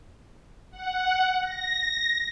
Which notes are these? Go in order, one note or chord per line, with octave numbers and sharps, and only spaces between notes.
F#5
A#6